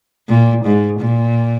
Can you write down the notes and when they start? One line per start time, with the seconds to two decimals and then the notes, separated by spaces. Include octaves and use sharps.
0.29 A#2
0.65 G#2
1.00 A#2